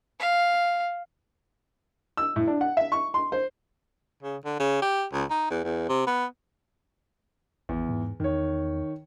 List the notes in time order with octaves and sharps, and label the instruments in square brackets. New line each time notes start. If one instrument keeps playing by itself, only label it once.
[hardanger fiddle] F5
[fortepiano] E6
A2
D4
F#5
E5
C#6
C6
C5
[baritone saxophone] C#3
D3
C#3
G4
C#2
D#4
E2
E2
C3
B3
[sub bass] G#1 [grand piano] E2
[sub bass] G#2
[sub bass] E2 [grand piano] D#3 C#5